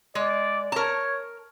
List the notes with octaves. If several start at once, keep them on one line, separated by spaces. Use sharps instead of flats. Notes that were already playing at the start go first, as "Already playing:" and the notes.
G#3 D5
A#4 C#5 A5